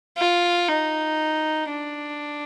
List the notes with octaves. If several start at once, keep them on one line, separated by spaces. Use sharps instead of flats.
F4
D#4
D4